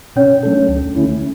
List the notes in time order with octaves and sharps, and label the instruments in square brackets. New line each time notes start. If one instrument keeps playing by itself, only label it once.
[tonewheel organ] B2 [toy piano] C#4 C#5
[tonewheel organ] F#3 A3 D4 A4
D2
D3 A3 C#4 E4